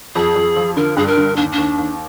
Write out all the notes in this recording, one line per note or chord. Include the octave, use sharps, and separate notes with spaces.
F2 G#4
F2
F3
D3 A#4
G2 G#4
A#4
D3
D#2 D4
D4
D#2
D#2